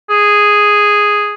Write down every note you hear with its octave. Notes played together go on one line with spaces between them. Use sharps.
G#4